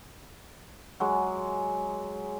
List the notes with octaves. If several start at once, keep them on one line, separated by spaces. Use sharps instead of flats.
F#3 G#3